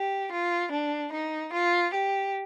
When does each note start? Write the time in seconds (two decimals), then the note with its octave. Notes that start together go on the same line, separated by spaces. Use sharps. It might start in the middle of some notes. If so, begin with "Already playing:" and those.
Already playing: G4
0.32 F4
0.72 D4
1.13 D#4
1.54 F4
1.94 G4